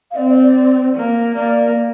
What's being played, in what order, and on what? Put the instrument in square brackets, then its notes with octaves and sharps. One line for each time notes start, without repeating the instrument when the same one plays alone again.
[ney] F5
[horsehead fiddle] C4 [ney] D5
[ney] D5
D5
[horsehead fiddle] A#3
[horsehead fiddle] A#3 [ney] D5